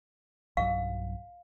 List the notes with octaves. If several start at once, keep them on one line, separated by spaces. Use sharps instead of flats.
B1 G2 F#3 F5